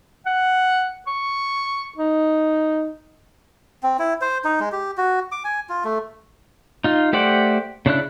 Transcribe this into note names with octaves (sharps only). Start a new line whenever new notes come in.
F#5
C#6
D#4
C4
E4
C5
D#4
G#3
G4
F#4
D6
G#5
F4
A3
D#4 F4
A3 G4 C5 D5 F#5
C#3 D4 E4 F#6